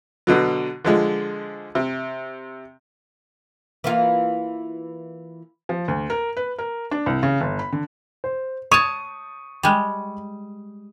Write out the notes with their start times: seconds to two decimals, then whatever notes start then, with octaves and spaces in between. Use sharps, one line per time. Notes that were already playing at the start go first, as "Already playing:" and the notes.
0.27 B2 D3 F#3
0.85 D3 F3 G#3
1.75 C3
3.84 E3 A#3 F4
5.69 F3
5.88 D2
6.10 A#4
6.37 B4
6.58 A#4
6.91 D4
7.06 C2
7.23 C#3
7.41 G1
7.59 B5
7.73 D3
8.24 C5
8.71 C#5 A5 C#6 D#6 D#7
9.63 G3 G#3